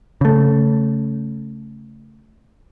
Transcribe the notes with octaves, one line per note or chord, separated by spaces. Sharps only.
C#3 A3